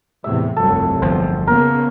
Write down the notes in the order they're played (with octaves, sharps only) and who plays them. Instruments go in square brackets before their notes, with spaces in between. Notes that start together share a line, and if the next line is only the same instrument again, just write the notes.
[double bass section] E2 A2 C3 [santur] E5
[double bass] F1 [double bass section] C2 G2 F#3 [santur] A4
[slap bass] G1 F3 [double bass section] E2 [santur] C5
[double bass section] C#3 A#3 [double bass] B3 [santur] A#4